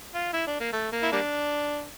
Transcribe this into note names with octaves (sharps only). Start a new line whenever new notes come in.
F4
E4
D4
A#3
A3
A#3
E4
G3 A#3 D4